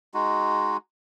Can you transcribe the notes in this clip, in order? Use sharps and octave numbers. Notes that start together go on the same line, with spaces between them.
G#3 D#4 F#4